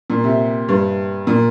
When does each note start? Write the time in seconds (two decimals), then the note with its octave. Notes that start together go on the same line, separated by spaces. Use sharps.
0.10 A#2
0.24 C3
0.69 G2
1.27 A#2